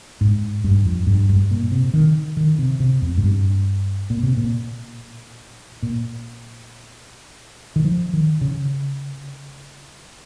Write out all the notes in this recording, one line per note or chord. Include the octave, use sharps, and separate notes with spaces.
G#2
G2
F2
G2
G2
A#2
C3
D#3
D#3
C3
C3
F2
G#2
G2
A#2
C3
A#2
A#2
D#3
F3
D#3
C#3